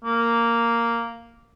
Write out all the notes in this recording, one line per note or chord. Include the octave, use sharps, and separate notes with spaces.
A#3